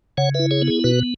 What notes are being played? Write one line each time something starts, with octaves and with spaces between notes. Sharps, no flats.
C#3 C#5 F#5
E4 B4 E5
G#4 C#5
B3
G#4
B2 F#4 B4